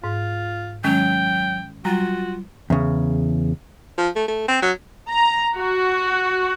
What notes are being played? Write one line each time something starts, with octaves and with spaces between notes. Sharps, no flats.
G#2 F4
D#3 F#3 G#3 C#4 G5
F#3 G3 F4 F#4 A#5
E2 C#3
F3
A3
A3
C4
F#3
A#5
F#4